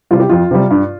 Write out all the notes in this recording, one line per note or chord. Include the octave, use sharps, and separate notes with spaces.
C3 G3 F4
G4
F2 F4
C3 G3
G2